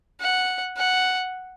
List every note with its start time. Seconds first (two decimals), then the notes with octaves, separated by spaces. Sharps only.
0.21 F#5
0.77 F#5